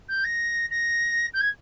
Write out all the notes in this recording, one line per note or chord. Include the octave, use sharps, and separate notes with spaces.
G6
A#6
A#6
G6
G#6